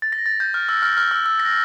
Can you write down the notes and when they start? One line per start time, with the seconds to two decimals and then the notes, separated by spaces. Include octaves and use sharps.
0.02 A6
0.13 A#6
0.26 A6
0.40 G6
0.54 F6
0.69 E6
0.82 F6
0.97 F6
1.11 E6
1.26 E6
1.39 A#6